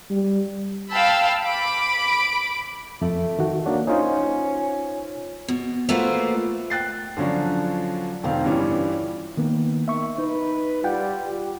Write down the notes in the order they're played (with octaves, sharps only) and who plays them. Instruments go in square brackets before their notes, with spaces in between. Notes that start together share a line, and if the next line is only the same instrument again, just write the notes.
[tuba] G3
[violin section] F5 G5 A5 B5 E6
B5 D6 D7
[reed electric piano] F2 [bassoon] A3
[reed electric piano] D#3 F#4
[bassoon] F#3 [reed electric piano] A#3 D4 F#4
[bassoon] C#4 [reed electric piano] D#4 F4 C5
[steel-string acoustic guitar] B2
A3 A#3 F4 F#4 B4 C5
[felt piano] G5 F#6 A6 C7
D3 F3 F#3 C#4 D4
F1 D#3 C4 F5
G2 E3 G3 C#4 E4 F4
[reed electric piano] D#3 A#3 B3
[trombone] D#3 [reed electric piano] E5 C#6
[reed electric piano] D#4 [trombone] B4
[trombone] G3 [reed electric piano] F4 F#5 G5
[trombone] G4